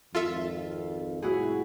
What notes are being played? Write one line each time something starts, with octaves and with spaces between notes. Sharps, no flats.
G#1 F2 F4 A4 E5
C2 A2 E4 F#4 G#4